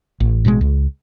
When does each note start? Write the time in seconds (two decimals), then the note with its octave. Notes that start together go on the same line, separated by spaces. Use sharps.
0.20 A1
0.45 A1 B2 E3 G#3
0.61 C#2